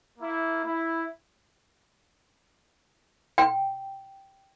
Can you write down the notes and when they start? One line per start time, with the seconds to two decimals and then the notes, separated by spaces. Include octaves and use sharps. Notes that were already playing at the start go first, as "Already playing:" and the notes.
0.19 A#3 E4
0.64 E4
3.38 G5